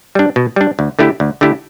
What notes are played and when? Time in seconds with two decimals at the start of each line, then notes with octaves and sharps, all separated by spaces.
0.15 G3 D4
0.36 B2
0.56 G3 D4
0.79 D2
0.99 D3 A3 E4 G4
1.20 D2
1.41 D3 A3 E4 G4